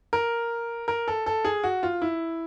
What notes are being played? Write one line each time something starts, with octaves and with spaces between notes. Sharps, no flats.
A#4
A#4
A4
A4
G#4
F#4
F4
E4